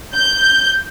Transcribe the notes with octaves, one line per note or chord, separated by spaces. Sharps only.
G6